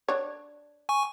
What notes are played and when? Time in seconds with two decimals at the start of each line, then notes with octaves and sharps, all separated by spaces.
0.08 D4 C#5
0.89 G#5 C#6